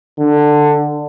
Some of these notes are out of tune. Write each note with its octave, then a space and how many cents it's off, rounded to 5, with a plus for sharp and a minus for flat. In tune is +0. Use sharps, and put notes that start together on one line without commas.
D3 +15